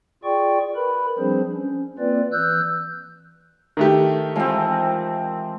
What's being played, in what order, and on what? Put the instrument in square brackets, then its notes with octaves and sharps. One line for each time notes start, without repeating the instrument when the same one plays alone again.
[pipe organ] F4 G#4 D5 G5 C#6
A#4 B4 B5
F3 G3 C4 D4 G#4 C5
C#4
A#3 C4 F4 B4 D5
E3 E6 F#6 G6
[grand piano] D#3 A3 G4
[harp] E3 G#3 A#4 [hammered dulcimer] F3 C4